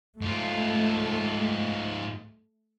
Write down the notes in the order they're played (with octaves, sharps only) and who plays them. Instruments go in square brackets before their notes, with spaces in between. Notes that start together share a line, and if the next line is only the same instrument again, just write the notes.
[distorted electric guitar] G#2 F4 [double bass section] A3